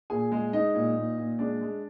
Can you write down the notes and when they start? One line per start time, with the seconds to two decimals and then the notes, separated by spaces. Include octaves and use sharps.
0.10 A#2 G#4 G#5
0.32 G#3
0.53 G#3 D#4 D#5
0.74 A#2
0.96 A#2
1.18 A#2
1.39 G#3 D4 D5
1.61 G#3